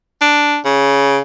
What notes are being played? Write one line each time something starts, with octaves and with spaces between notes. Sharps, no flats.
D4
C#3